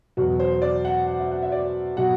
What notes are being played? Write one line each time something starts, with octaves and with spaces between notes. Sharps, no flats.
E2 B2 F#3 F#4
C5
D5
F#5
F#5
E5
F#5
E5
D5
B2 F#3 F#5